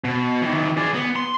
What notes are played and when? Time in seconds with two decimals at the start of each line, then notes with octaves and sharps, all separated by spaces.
0.04 B2
0.42 D#3 E3
0.77 G#4 D5
0.94 B3
1.16 C6